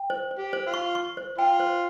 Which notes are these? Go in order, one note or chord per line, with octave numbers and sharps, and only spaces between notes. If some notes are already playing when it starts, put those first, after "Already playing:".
Already playing: G5
C5
C5
G4
C5
F4
C#6
C#6
C5
F4 G5
C5